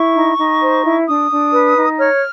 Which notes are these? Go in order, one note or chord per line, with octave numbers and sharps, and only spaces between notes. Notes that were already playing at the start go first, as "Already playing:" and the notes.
Already playing: E4 C#6
D#4
D#4
C5
E4
D4 D#6
D4
B4
D#4
C#5 F6